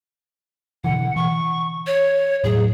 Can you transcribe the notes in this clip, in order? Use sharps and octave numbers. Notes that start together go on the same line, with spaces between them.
B2 D3 E3 F#5
E3 C#6
C#5
E1 A2 F#3 G#4